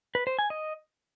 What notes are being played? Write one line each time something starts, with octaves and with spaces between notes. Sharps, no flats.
B4
C5
G#5
D#5